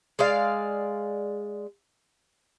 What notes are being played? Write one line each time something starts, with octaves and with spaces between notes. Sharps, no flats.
G#3 D5 F5